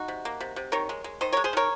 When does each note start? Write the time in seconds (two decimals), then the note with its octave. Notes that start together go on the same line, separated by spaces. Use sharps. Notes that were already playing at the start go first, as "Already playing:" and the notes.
Already playing: D#4 F#4
0.08 C3
0.25 A#3
0.41 C3
0.56 C3
0.72 D#3 A#4 C#5
0.89 G#3
1.04 G#3
1.21 D#3 C5 D#5
1.33 G#3 A#4 C#5
1.44 G#4 C5
1.53 D#3 A#4 C#5